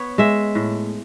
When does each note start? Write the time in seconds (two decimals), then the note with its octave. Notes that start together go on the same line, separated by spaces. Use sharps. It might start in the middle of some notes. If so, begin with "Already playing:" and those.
Already playing: B3 C#5
0.18 G#3 E5
0.55 A2